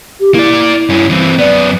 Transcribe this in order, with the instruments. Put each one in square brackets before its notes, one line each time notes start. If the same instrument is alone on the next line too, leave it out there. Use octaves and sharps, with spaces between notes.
[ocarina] G4
[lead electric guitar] A#3 D5 [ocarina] E4
[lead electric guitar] G2 C#4
E3 C4
[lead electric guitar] F#2 B3 [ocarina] D5